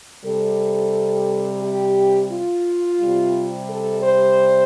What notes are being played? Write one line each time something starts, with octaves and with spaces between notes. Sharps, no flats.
C3 G3 A4
G4
F4
C3 G3
A4
C5